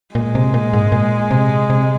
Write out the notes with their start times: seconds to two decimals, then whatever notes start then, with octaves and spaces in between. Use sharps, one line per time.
0.15 A#2 G#3
0.35 C3
0.54 A#2
0.73 G#2
0.92 A#2
1.31 C3
1.70 C3